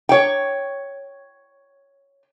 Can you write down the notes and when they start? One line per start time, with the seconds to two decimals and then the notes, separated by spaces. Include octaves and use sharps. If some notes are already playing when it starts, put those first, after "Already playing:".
0.09 C#5 G5